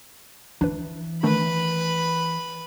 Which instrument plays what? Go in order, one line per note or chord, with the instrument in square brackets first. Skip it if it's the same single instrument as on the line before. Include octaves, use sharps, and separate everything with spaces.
[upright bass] E3 [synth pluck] D4 B4
[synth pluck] D#3 A3 D4 [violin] B4 B5